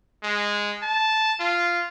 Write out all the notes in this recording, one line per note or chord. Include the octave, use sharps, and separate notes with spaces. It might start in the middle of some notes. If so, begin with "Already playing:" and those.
G#3
A5
F4